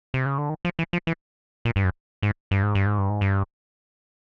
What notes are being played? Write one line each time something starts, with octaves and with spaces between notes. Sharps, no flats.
C3
C#3
D3
D#3
F3
E3
F3
E3
A#2
G2
F#2
G#2
G2
G#2
G2
G#2
G2
G#2
G2